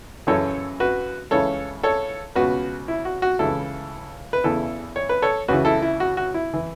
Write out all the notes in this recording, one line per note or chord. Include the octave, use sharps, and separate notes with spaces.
F#2 C#3 E3 A4 C#5
F#4 B4
C#2 C#3 E3 A4 C#5
A4 C#5
C#2 B2 F#4 B4
E4
F#4
F#4
C#2 C#3 E3 E4 A4
B4
E2 C#3 E3 E4 A4
C#5
B4
A4 C#5
C#2 C#3 E3 F#4 B4
E4 A4
E4
F#4
F#4
E4
E3